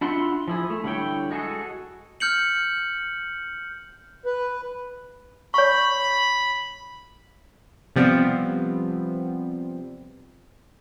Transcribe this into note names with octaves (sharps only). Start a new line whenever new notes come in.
D4 E4 F4 F#5 C6
F3 E4 G#4
A3
D3 G3 E4 C#5 G5
G#3 F#4 G#4 A4
F6 G6 C#7 F#7
B4
C#5 B5 C#6
C3 F3 G3 B3 C4